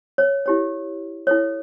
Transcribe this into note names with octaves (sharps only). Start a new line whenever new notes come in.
C#5
E4 G4 C#5
E4 A4 C#5